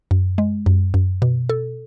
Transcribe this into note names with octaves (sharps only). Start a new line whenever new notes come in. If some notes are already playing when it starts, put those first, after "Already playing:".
F#2
G#3
F#2
F#2
B2
A4